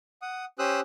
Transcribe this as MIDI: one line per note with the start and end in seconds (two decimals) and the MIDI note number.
0.22 0.45 78
0.22 0.45 87
0.59 0.80 61
0.59 0.80 67
0.59 0.80 72
0.59 0.80 87
0.59 0.80 88
0.59 0.80 90